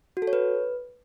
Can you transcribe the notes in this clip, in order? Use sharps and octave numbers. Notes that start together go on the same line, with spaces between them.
F#4
A4
C#5
B4